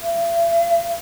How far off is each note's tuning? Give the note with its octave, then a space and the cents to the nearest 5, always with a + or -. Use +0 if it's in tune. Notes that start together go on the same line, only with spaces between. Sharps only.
E5 +45